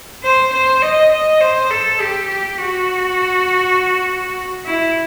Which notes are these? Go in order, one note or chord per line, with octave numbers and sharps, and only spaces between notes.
C5
C5
D#5
D#5
C5
A4
G4
G4
F#4
E4